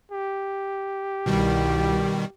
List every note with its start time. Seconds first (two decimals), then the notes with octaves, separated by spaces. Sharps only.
0.12 G4
1.26 C2 B2 D#3 G3